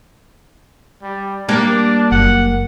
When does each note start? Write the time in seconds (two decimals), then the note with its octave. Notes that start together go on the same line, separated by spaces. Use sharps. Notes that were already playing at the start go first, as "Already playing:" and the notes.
1.03 G3
1.49 G3 A#3 D4
2.12 F#1 F#5